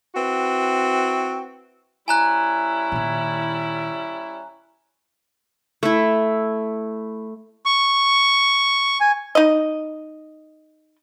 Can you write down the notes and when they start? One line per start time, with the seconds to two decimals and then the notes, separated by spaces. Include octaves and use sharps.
0.15 C4 E4 F#4 B4
2.08 G3 C#4 E4 G#5 A#5 F#6
2.92 A#2 D#3
5.83 A3 E4
7.66 C#6
9.01 G#5
9.35 D#4 D#5